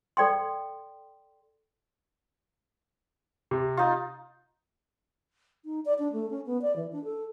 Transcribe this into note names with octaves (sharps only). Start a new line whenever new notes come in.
A4 D5 G5 C6
C3
D#4 F4
D#4
D5
D4
A3
C#4
B3
D5
E3
D4
A4